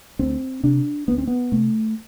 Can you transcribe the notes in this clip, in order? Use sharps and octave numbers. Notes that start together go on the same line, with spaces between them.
D2 C4
C3 D4
D2 B3
C4
B3
C3 A3